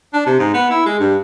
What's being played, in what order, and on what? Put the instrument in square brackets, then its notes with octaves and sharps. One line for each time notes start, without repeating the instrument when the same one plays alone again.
[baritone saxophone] D4
C3
G#2
B3
E4
G#3
G2